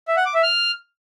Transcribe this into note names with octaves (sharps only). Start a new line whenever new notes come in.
E5
F#5
D6
E5
F6